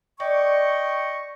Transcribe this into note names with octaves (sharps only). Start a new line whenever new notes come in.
D5 D#5 G5 C#6